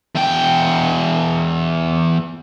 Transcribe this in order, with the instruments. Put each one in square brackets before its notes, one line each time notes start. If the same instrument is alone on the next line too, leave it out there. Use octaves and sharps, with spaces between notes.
[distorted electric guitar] E2 G5